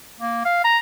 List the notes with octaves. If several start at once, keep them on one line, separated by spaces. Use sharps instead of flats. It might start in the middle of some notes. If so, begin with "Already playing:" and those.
A#3
F5
A#5